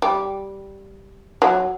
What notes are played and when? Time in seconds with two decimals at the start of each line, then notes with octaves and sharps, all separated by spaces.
0.02 G3
1.42 F#3